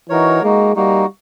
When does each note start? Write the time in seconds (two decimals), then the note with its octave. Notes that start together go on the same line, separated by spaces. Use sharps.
0.09 E3 D#4 F#4 A#4 C#5
0.43 G#3 A#3 D#4 F#4
0.76 G3 A#3 D#4 F#4